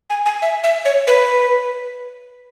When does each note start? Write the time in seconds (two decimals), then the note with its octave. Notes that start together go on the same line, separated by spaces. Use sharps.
0.10 G#5
0.26 G#5
0.42 E5
0.64 E5
0.85 C#5
1.07 B4